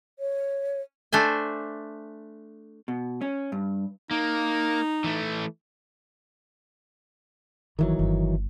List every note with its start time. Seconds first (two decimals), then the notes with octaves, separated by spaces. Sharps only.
0.19 C#5
1.13 A3 D4 C5 G#5
2.88 B2
3.21 C#4
3.52 G2
4.11 A#3 D#4
5.04 E3 A3
7.79 G1 D#3 E3 F#3
7.99 G1